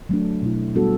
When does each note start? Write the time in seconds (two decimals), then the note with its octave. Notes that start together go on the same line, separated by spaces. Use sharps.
0.09 F#3 A3 D4
0.42 B2 A3 E4
0.75 G3 B3 D4 F#4 A4